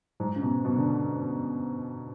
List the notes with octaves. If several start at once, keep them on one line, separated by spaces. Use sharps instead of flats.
G#2
C#3
B2
B2
D3